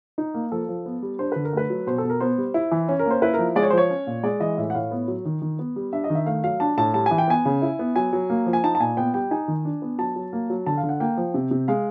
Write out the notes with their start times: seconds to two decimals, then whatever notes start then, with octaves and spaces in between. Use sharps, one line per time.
0.18 D#4
0.34 A#3
0.52 F3 A4
0.69 F3
0.86 B3
1.02 G3
1.19 D4 C5
1.32 D3 B4
1.45 A#4
1.53 A3 B4
1.70 F#3
1.87 B2 C5
1.98 A4
2.04 B2
2.10 A#4
2.20 B3 C5
2.38 G3
2.54 E4
2.71 E3
2.88 C#4
2.99 A#4
3.06 A#3 C5
3.22 E4 B4
3.34 A#4
3.39 F3
3.56 G#3 D5
3.63 C#5
3.70 F3 C5
3.78 C#5
3.90 C#4
4.07 A#2
4.23 G#3 D5
4.40 E3 D#5
4.57 A2 E5
4.70 F#5
4.75 A2 F5
4.91 B3
5.08 F#3
5.25 D#3
5.42 D#3
5.59 B3
5.76 G3
5.93 D4 E5
6.04 D#5
6.10 D#3
6.15 E5
6.26 A3 F5
6.44 F#3 F5
6.60 D4 A5
6.77 A2 A5
6.94 G3 A5
7.06 E3 G#5
7.18 G5
7.28 B3 G#5
7.45 C#3
7.62 E4
7.79 B3
7.96 F#3 G#5
8.13 F#3
8.30 A#3
8.46 F3
8.53 G#5
8.64 D#4 A5
8.75 A5
8.80 A#2 G#5
8.97 B3 G5
9.14 G3 G5
9.31 D#4 G#5
9.48 D#3
9.65 D4
9.82 B3
9.98 F#3 A5
10.16 F#3
10.33 A#3
10.50 F#3
10.66 D3 A5
10.77 F5
10.83 D3
10.89 F#5
11.00 A#3 G5
11.17 F3
11.34 C3
11.51 C3
11.68 G#3 F5